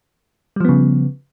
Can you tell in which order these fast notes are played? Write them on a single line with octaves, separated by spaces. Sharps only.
G3 F3 B3 C#3